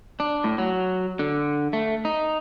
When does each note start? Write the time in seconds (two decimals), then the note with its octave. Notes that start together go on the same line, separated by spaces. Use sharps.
0.20 D4
0.44 A2
0.58 F#3
1.19 D3
1.73 A3
2.05 D#4